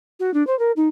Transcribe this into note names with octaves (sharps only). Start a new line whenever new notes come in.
F#4
D4
C5
A#4
D#4